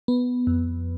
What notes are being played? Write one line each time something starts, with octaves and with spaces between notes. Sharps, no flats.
B3
F2